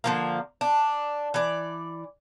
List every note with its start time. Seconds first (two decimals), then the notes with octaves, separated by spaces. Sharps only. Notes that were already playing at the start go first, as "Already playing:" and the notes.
0.04 D3 F3 A#3
0.61 D4
1.34 E3 D5